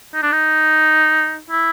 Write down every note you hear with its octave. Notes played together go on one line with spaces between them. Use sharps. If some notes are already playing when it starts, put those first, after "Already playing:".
D#4
D4
D#4
E4